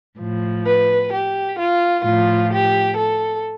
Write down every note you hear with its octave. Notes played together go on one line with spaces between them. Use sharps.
A2 F3
B4
G4
F4
A2 F3 F4
G4
A4